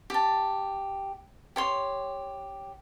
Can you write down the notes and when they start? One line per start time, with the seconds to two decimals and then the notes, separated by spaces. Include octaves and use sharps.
0.10 G4 A5
1.56 G4 C#5 C6